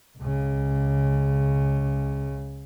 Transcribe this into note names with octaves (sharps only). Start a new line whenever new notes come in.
C#2 C#3